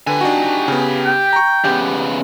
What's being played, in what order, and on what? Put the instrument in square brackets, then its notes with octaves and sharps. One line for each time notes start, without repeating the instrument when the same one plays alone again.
[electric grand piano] D3 B4 [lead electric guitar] G4 G#5
[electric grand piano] D4 D#4 F#4
C#3 B3
[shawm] G5
[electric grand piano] A#5 C#6
[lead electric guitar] C#3 B3 [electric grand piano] G4